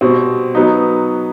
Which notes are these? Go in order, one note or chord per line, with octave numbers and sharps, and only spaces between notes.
B2 G3 C4
F#3 B3 D#4